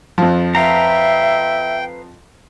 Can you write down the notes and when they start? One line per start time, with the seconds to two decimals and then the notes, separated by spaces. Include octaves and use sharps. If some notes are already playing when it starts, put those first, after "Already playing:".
0.18 F2 F3
0.55 B4 E5 F5 G5 A#5